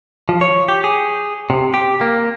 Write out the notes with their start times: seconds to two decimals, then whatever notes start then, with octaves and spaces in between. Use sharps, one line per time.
0.29 F3
0.41 C#5
0.68 G4
0.84 G#4
1.50 C3
1.74 G4
2.01 A#3